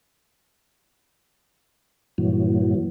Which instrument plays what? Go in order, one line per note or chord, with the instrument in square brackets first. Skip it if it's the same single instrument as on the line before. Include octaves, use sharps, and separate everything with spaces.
[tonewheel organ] G2 A#2 E3 F#3